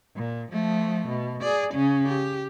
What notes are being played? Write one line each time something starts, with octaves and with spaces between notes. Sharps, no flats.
A#2
F3 A3
B2
G#4 D5
C#3 C#4
G4